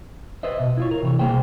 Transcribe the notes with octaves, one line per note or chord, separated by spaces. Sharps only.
B4 C5 D#5 E5
B2
E4 F4 C#5
A#4
C3 E3 C#5
C2 B2 A#3 G#4 C5 G5